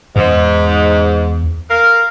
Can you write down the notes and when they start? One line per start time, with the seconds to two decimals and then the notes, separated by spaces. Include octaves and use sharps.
0.16 E2 G#2
1.69 A#4 F5